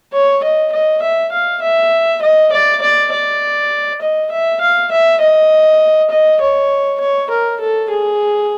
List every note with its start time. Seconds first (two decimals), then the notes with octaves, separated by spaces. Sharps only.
0.13 C#5
0.43 D#5
0.72 D#5
1.02 E5
1.32 F5
1.62 E5
2.22 D#5
2.52 D5
2.82 D5
3.12 D5
4.01 D#5
4.31 E5
4.61 F5
4.92 E5
5.20 D#5
6.10 D#5
6.41 C#5
7.00 C#5
7.30 A#4
7.60 A4
7.90 G#4